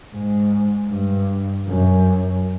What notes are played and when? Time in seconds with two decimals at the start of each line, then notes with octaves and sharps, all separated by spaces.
0.14 G#2
0.91 G2
1.68 F#2